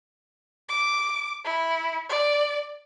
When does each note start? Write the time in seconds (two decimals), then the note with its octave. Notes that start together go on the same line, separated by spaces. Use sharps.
0.69 D6
1.45 E4
2.09 D5